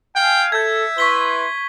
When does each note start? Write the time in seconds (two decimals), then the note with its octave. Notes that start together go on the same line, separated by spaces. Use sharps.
0.16 F5 G5 G#5
0.52 A4 E5 G6 G#6
0.98 E4 B4 C6 C#6 B6 G7